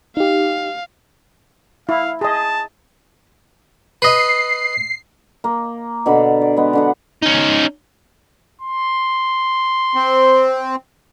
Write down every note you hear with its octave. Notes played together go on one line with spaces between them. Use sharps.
D#4 G4 F5
E4 F5
G#4 D#5 A5
B4 D#5 C7
A#3
B2 D3 D5 B5
D5
G#3 B3
D3 D4 F#5
C#4 D#4
C6
C4